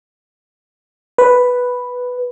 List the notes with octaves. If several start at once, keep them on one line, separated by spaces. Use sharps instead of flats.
B4